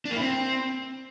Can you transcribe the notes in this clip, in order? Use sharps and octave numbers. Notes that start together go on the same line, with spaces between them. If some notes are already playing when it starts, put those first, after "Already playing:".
D4
A#3
E4
C4